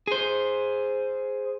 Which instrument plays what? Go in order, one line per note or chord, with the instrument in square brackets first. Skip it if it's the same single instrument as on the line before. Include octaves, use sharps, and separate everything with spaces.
[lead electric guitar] G#4 C5